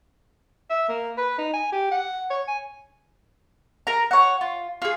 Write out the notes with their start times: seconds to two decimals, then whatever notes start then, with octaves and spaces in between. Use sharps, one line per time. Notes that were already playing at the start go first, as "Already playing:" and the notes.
0.70 E5
0.89 A#3
1.17 B4
1.38 D#4
1.54 G#5
1.72 G4
1.91 F#5
2.30 C#5
2.47 G#5
3.87 A#4 A#5
4.11 C#5 F#5
4.41 F4
4.82 F4 G#4